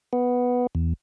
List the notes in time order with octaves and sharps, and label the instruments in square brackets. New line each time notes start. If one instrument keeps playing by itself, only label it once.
[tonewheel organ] B3
E2